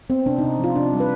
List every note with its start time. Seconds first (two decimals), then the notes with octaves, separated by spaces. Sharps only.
0.10 B3 C4
0.26 C3 D4
0.38 D#4
0.43 C3
0.59 F3
0.64 F4
0.76 C3 D4
0.93 G3
1.00 B4